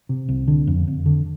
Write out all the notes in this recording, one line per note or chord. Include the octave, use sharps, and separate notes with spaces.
C3
C2
D3
F2
F2
D3